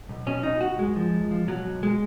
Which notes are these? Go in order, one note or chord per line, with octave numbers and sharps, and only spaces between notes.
B1
B2 C#4
B1 D#4
B1 F#4
F#2 G#3
F3
F#2
F3
B2 F#3
B1
G#3